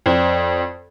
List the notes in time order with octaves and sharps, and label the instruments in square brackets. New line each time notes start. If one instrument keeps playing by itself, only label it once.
[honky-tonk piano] F2 [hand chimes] C5 D5 G5